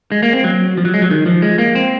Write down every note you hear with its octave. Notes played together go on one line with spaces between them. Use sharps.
G#3
A#3
C4
F#3
F3
F#3
G#3
F#3
D#3
F3
G#3
A#3
C4